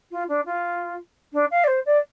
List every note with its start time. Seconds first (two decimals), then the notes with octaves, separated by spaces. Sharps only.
0.11 F4
0.28 D4
0.46 F4
1.33 D4
1.51 F5
1.64 D5
1.67 C5
1.86 D5